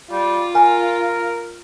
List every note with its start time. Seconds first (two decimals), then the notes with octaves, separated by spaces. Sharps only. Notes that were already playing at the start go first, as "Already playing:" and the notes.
0.11 G3 F4
0.55 A#4 G#5